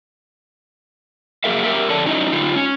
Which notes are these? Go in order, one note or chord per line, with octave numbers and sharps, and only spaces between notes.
A#3 F#4 G#4 A#4 E5 F5
G4 A#4 E5
F2 C#4 A4 D5 A5
F#3 C#4 D#4 E4 D#5
D3 D#4 F4
C#4